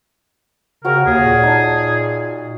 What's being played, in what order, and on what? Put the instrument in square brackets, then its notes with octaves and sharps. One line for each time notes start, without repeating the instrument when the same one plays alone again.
[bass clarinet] C#3 [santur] F#4 C#5 G5 [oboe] A#4
[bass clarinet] D#2 [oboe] G#4
[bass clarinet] A#2
[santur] D#4 A5